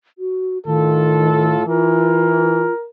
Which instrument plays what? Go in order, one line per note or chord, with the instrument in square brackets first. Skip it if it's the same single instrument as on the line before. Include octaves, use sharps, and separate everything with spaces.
[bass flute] F#4
[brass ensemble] A2 F4 A4 [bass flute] D#3
[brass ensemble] E3 [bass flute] F4 [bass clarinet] A#4